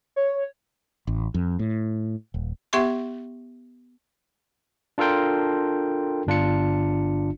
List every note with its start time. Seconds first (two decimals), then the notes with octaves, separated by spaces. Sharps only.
0.16 C#5
1.07 A1
1.34 F2
1.59 A2
2.34 D#1
2.73 B3 G4 E5 C6 C#6
4.98 D4 F4 A4 A#4 G5 C6
6.27 G1 D4 F4 C#7